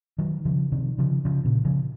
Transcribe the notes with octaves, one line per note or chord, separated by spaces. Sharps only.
D#3 F#3
C#3 F3
C3 D#3
C#3 F3
C#3 F3
A#2 C#3
C#3 F3